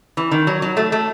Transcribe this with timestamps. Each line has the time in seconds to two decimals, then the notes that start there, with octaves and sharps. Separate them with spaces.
0.17 E3
0.31 D#3
0.47 F#3
0.62 F#3
0.77 A3
0.92 A3